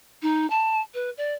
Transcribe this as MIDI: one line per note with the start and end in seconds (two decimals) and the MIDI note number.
0.22 0.48 63
0.50 0.80 81
0.94 1.10 71
1.17 1.33 74